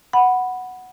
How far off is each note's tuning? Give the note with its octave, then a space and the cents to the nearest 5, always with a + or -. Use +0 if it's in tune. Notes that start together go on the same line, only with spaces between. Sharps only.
F#5 +0 B5 +0